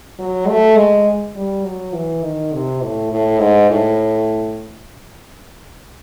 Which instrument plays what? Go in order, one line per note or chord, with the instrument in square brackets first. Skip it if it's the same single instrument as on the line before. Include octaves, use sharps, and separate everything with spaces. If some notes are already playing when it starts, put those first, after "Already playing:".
[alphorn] F#3
A3
G#3
G3
F#3
E3
D#3
C3
A2
A2
G#2
A2